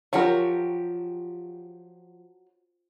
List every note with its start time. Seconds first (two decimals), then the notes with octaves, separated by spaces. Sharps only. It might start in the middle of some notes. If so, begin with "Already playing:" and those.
0.13 F3 F#3 G4 A#4 C#6